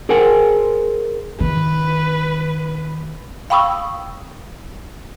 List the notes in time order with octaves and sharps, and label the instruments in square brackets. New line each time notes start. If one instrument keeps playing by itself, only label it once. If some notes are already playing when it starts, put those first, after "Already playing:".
[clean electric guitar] G#4 A#4 C5 F#5 G#5
[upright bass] D#3 [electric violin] B4
[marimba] F5 G5 B5 C#6 D#6 E6